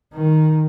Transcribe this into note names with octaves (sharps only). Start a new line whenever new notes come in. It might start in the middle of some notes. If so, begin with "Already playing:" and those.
D#3